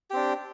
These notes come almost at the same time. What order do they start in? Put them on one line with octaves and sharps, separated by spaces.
G4 C4 D4